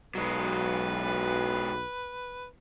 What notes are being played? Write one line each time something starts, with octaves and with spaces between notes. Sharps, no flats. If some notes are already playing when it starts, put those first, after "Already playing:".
B1 F#3 G#3 B4